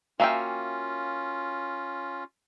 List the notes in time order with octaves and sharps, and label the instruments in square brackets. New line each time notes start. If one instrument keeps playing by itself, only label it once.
[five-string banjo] A#3 E5 G5 [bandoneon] C#4 F4 [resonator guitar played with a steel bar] F#4 F5 G#5